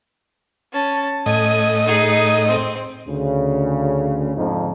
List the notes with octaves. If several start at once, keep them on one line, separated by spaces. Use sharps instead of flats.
C#4 A5
A2 D#5 G#5
D#4 G#4
C4
D2 C#3
F2 G#2 D3 F3 D#4